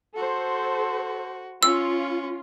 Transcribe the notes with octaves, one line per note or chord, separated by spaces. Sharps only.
F#4 A4 C5
C#4 F4 E6